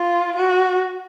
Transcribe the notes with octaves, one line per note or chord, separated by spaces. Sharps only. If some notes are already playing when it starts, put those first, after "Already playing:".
Already playing: F4
F#4